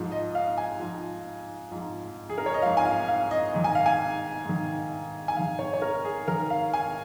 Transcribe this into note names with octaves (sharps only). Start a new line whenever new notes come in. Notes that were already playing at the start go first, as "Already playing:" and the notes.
Already playing: G#2 F3
D#5
F5
G#5
G#2 F3
G#2 F3
G#4
A#4
C#5
D#5
G#2 F3 F5
G#5
F5
F5
D#5
G#2 D#3
G#5
F5
G#5
G#2 D#3
G#5
G#2 D#3 F5
C#5
C#5
A#4
G#4
G#2 D#3 A#4
F5
G#5